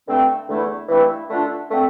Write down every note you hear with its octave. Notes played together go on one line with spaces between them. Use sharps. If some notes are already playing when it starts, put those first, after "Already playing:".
G2 D3 A3 C4
E2 D3 A3 E4
G2 E3 A3 C4 E4
D3 A3 D4 F4
D3 A3 C4